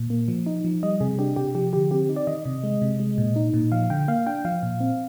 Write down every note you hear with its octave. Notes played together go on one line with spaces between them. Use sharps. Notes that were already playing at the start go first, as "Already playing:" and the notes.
Already playing: A#2
A#3
F3
D#4
F3
G3 D#5
C3 G#4
D4 G4
C3 G4
F3 G4
D3 G4
C4 G4
D#4
D5
D#3 D#5
C3
G#3
C3
G#3
A#2
D#4
A#2
F3 F5
D3 G5
A#3 F5
D4 G5
F3 F5
A#2
C4